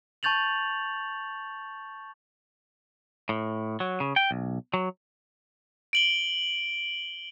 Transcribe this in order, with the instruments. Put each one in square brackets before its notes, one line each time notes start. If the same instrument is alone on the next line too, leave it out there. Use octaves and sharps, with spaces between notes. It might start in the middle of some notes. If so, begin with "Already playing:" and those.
[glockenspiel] A5 C#6 G6 A6 F7 F#7
[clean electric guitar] A2
F#3
C#3
G5
B1
F#3
[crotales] D7 F#7 G7